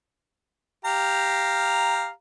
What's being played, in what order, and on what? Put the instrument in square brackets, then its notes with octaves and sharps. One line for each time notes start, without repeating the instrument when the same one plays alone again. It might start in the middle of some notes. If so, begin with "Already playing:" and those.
[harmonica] G4 F5 A#5